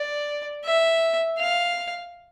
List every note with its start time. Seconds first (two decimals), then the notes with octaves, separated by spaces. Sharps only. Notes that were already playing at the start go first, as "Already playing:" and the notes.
Already playing: D5
0.65 E5
1.38 F5